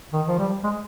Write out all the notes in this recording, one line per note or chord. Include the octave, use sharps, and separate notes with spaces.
D#3
F3
G3
G#3